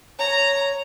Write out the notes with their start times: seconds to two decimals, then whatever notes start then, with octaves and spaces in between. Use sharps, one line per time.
0.19 C#5 A#5